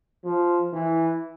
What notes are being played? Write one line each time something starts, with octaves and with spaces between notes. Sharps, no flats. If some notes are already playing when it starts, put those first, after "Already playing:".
F3
E3